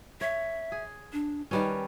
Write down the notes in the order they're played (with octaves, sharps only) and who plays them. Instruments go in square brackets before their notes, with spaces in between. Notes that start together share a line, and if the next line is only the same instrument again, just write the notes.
[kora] C#5 [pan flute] E5
[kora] G#4
[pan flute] D4
[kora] D#3 G3 C#4 [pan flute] B4